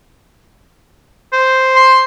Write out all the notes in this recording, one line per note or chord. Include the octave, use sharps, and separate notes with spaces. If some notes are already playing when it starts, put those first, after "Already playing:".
C5
C6